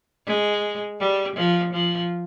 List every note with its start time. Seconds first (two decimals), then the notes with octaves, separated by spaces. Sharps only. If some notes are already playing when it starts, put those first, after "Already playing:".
0.26 G#3
1.00 G3
1.36 F3
1.73 F3